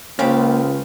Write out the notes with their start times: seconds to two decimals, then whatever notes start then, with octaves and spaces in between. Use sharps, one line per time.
0.19 C#2 A#3 C#4 C5 F5 G5 B5